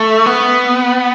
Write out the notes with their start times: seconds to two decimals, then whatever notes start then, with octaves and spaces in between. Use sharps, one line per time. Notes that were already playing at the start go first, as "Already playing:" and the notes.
Already playing: A3
0.26 B3